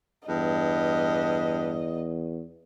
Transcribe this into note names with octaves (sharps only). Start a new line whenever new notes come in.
E2 G2 D#5